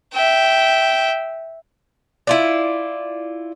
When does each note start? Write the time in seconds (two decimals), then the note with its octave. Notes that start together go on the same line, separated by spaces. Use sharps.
0.14 E5 G5
2.27 E4 F4 D5